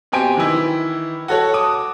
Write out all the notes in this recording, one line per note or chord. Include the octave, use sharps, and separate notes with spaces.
B2 C4 G4 G#5 D7
D#3 E3 E4
F#4 A4 C#5 F#5
A5 D6 D#6